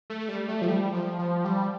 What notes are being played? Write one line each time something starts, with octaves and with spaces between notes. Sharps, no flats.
A3
G3
A3
F3
G3
F3
F3
G3